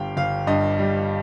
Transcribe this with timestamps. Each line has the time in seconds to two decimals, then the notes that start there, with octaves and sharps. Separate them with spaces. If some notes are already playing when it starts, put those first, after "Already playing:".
Already playing: G1 G3 F5 G5
0.17 G1 F5
0.47 G2 D#5
0.79 G3